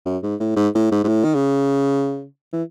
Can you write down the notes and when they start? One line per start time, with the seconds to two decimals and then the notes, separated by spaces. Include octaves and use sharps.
0.06 F#2
0.23 G#2
0.40 A2
0.57 G#2
0.75 A2
0.92 G#2
1.04 G#2
1.08 A2
1.24 D#3
1.35 C#3
2.53 E3